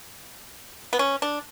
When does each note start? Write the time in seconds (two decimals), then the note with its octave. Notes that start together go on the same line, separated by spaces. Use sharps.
0.93 B3
0.99 C#4
1.22 D4